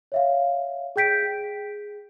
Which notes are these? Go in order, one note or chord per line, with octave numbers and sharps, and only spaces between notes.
C#5 E5 F5
G#4 G5 G6 B6 D7
G#4